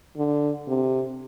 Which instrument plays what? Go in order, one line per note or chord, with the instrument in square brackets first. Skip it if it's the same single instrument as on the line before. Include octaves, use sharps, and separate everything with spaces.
[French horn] D3
C3